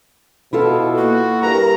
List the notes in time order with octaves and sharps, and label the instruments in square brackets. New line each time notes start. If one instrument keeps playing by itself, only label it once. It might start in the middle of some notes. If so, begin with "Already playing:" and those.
[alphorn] B2 [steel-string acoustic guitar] E4 F4 A4
[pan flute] A#3 [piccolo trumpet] F#4
[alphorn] G2 [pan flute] A#4 [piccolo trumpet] A#5